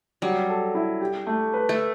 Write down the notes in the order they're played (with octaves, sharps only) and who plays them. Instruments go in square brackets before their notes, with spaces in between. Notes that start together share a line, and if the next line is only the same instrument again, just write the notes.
[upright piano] F#3 [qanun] G3
[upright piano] A4
E4
G4
A3
B4
[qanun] A3